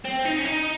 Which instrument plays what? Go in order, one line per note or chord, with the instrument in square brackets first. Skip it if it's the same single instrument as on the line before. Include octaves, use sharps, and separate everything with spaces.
[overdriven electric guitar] C4
D#4
C#4
D#4